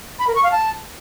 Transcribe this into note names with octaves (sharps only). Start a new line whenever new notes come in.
B5
A#4
C#6
F5
A5